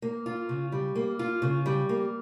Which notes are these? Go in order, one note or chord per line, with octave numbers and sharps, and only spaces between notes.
A#3
F4
C#3
G3
A#3
F4
C#3
G3
A#3